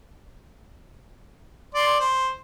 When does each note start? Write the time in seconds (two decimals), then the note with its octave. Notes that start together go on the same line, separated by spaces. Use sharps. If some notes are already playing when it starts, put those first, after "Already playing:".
1.74 D5 C6
2.00 C5